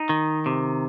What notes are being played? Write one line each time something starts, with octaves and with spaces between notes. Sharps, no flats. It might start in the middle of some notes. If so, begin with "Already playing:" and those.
Already playing: D#4
D#3
C3